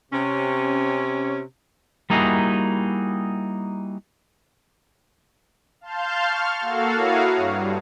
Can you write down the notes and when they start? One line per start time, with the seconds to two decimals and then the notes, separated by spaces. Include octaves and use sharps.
0.12 C3 C#4
2.10 G3 A#3 D#4 E4 F#4 G#4
5.81 F5 A5 C6 F6 G6
6.25 C#6 F6 A6
6.59 A#3 F#4 A4 F5
6.95 E4 F#4 C#5 F5 A#5 D#6
7.36 G2